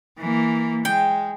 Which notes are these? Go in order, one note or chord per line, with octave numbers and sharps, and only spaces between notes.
E3 A#3
G#3 G5